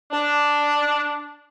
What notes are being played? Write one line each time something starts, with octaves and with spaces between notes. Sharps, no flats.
D4